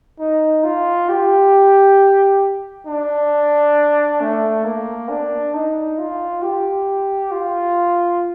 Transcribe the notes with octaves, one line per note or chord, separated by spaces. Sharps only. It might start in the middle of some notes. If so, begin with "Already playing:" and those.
D#4
F4
G4
D4
A3
A#3
D4
D#4
F4
G4
F4